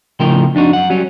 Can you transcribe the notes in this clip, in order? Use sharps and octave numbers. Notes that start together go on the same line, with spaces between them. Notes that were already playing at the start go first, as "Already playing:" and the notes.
A2 C#3 F3 A#4 G5
F2 D4 D#4 F#4
F#2 F#5
F#3 G3 C#4